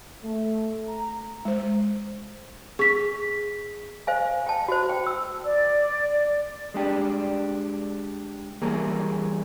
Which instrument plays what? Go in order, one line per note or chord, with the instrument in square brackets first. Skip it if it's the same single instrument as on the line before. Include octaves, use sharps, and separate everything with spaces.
[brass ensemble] A3
A#5
[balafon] G#3 C5
[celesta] G#4 B6 [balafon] C#6
[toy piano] C5 F5 G#5
G5 A5
F#4 C5
G5
E6
[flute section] D5
[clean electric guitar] G#3 D4 G4
E3 G3 A#3 G#4 A#4